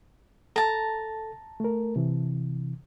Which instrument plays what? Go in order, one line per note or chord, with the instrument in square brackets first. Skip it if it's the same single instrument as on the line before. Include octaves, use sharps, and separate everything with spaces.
[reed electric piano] A4 [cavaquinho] A5 A#5
[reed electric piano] A3 A#4
C3 E3